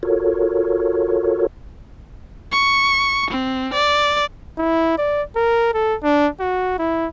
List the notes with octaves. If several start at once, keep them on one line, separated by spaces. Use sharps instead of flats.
F4 F#4 A4 A#4 C#5
C#6
C4
D5
E4
D5
A#4
A4
D4
F#4
E4